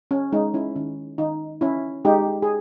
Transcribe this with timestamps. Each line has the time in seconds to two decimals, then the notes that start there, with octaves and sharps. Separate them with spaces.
0.11 C#4
0.32 G#3 D#4
0.54 C#4 E4
0.76 D#3 C#4
1.18 D#3 D#4
1.61 C#4 E4
2.05 G#3 D#4 G4
2.42 G#4